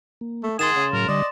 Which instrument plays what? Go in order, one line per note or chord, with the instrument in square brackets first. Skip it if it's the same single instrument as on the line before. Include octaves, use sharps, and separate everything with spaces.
[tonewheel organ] A#3
[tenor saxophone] A3
[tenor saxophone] D#3 [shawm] G#4 [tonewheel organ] F#5 D#6 [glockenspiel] C6 A6 E7
[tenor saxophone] C#3
[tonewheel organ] A2 F#3 [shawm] A#4
[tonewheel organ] D3 G3 [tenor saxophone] D5 [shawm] D#5